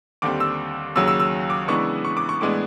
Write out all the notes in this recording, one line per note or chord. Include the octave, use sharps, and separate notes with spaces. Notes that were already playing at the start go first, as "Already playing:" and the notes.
D#2 D3 G3 C4 D6
E6
D#2 C#3 F#3 E6
E6
E6
D6
C#3 E3 G#3 B3 D4 C#6
C#6
D6
C#6
A2 E3 G#3 B3 D4 D6